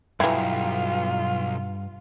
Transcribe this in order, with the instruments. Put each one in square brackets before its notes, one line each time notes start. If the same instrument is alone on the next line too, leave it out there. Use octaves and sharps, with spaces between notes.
[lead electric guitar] B1 [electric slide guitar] G2 G5 A#5 [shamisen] E3 E4 [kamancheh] F4